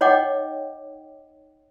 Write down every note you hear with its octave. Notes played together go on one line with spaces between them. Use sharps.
D#4 C#5 D#5 F#5 G5 D6